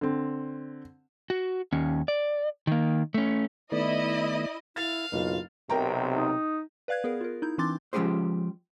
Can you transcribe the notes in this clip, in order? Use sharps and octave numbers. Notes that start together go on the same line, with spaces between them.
D3 C4
F#4
D#2 C#4
D5
D#3 A#3
A3 C#4
D#3 A3 B3 E4 D5 D#5
E4 F5 A6
F#1 B1 F4
B1 C3 A#4 G5 A#5
D#4
B4 D5 F5 F#6 G#6
B3 G#4 A#4
F4 A#4
D#4 E4 G6
E3 C4 D4 C6 D6 A6
F3 G#3 C#4 G4 G#4 C5